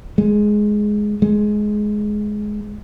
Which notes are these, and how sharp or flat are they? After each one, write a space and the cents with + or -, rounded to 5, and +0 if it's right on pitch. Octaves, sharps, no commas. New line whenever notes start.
G#3 +5
G#3 +10